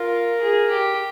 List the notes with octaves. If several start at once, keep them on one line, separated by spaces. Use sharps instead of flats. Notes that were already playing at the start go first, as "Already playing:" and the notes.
Already playing: F4 A#4
G#4
G4